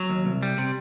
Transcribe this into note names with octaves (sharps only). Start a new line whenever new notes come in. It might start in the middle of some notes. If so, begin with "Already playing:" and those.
Already playing: F#3
D#2
C2
G3
C3